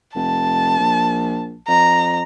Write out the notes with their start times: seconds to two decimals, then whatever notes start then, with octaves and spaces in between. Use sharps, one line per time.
0.15 F1 A5
0.79 A#1
1.68 F2 A#5